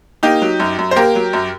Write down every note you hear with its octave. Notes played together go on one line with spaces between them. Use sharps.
A#3 D#4 G4
F#3
F#2
F#2
C5
A#3 G4 A#4
F#3
F#2